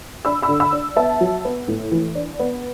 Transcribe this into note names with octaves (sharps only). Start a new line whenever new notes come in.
D4 B5 E6
B5 E6
D3
B5 E6
D4
B3 E5 A5
F#3
B3
A2
E3
D4
B3